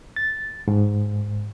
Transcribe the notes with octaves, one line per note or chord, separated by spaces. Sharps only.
A6
G#2